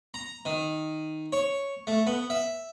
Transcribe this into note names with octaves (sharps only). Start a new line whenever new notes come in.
A#5
D#3
C#5
A3
B3
E5